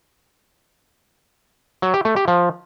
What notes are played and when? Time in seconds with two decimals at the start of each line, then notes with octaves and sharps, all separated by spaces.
1.82 F#3
1.94 G4
2.05 A3
2.16 G4
2.28 F3